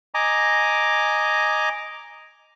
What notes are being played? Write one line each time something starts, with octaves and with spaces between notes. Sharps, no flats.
D#5 G#5 A#5 D6